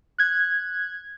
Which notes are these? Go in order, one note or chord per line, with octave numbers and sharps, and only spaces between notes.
F#6 G#6